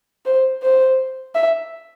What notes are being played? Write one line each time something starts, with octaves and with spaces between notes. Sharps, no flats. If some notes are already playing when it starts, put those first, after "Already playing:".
C5
C5
E5